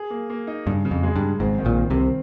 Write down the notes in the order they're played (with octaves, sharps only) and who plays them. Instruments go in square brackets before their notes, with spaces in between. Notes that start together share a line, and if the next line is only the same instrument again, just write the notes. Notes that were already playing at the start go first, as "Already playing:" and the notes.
Already playing: [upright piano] G#4
A#3
A#3
D#4
[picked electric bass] G2 [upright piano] C#3
[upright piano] C#3
[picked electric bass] F2
[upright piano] G#3
[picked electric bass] G2
[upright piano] C#3
[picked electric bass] G#1 G#2 [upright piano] C4
[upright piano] D#3
[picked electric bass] A#1 A#2
[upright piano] D#3
[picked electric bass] C2 C3
[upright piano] C4